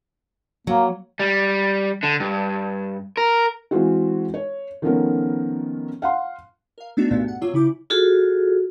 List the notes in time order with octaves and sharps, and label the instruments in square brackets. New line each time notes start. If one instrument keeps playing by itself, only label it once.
[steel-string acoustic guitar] F#3 [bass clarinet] A#3
[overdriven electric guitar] G3
D3
G2
A#4
[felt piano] E3 G#3 C4 F4 F#4
C#5
D#3 F3 A3 B3 C#4 A#4
F5 F#5 C6
[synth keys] A#4 F5
A3 B3 D4 D#4 F#4
C2 G2 A#2 A3 B3
F#5
C3 F#3 F4 C#5 E6
C#3 E4 D6 G6
[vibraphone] F4 F#4 G#4 A4